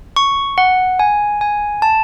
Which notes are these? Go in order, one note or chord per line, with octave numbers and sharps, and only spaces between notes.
C#6
F#5
G#5
G#5
A5